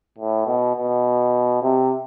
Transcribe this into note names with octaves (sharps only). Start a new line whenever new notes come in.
A2
B2
B2
C3